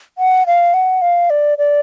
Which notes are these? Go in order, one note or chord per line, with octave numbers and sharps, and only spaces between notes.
F#5
F5
F#5
F5
D5
D5